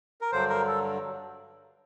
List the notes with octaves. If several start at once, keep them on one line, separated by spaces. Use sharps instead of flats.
A#4
G2 D3 F#3 C5
A#4
A4